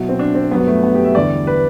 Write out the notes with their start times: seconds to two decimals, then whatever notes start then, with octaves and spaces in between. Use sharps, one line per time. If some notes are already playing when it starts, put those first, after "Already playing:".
Already playing: B2 F#3 E4
0.09 C4
0.19 D4
0.35 C4
0.51 G2 F#3 B3
0.67 A3
0.83 B3
0.94 G4
1.04 E5
1.15 E2 D3 G3 D5
1.47 B4